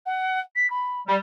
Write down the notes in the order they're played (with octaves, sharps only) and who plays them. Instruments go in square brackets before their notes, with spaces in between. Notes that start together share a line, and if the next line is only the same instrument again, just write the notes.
[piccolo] F#5
B6
B5
[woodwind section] G3